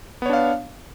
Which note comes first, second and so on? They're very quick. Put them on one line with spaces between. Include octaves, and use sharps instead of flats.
B3 C#5 D4 F5